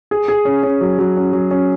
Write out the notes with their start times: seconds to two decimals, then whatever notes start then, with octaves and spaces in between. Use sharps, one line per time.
0.11 G#4
0.28 G#4
0.45 C#4
0.63 C#4
0.81 F#3
0.99 F#3
1.17 C#4
1.33 F#3
1.51 C#4